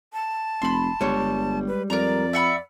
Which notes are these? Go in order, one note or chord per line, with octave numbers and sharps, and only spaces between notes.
A5
F1 B5 C6
G1 G3 G#3 C#5
B4
F2 A#4 D5 A#5
E5 F#5 B5